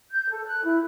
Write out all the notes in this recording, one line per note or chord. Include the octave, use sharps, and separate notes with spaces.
G6
A4
F#6
E4